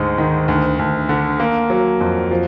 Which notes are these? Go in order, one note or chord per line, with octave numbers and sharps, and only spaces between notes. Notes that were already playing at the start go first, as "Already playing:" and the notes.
Already playing: D2 G#2 D3 G#3
D#3
D2
D2
D3
A#3
F#3
F2
F3